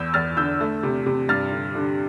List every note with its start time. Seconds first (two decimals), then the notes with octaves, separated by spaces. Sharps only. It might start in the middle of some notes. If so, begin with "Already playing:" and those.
Already playing: E2 E6 G6
0.14 E2 F6 A6
0.37 D3 E6 G6
0.60 A3
0.83 C3
1.06 C3
1.29 G2 F6 A6
1.51 D3
1.75 D3